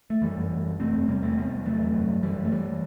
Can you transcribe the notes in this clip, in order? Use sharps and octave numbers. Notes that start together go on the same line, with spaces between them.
A3
F#2 E3 G3
F#2
F#2
F#2
C3 A3 C4
E2
C3 G3 B3
E2 A3 C4
C3 G3 B3
E2
C3 F#3 A3
E2
F#2
F#2
F#2 E3 G3
F#2
A3
G2 E3 G3